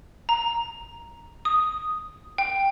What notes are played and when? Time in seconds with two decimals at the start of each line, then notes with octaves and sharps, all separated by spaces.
0.29 A#5
1.45 D#6
2.38 G5